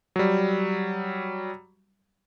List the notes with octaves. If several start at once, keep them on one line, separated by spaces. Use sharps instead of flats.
F#3 G3